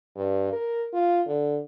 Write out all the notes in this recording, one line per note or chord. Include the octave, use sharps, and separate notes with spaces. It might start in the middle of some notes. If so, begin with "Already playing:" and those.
G2
A#4
F4
D3